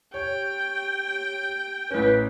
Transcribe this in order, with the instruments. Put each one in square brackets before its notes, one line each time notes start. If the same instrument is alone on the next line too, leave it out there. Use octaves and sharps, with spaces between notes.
[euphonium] G4 [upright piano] C#5 [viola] G5
[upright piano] A1 C#4 [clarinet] B4